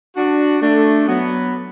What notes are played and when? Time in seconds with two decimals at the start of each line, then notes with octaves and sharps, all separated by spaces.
0.17 D4 F#4
0.62 A3 D4
1.08 F#3 B3